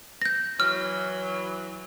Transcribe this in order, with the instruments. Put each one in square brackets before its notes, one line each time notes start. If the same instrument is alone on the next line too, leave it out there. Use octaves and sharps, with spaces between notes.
[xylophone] G6 A#6
[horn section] E3 F#3 [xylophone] F6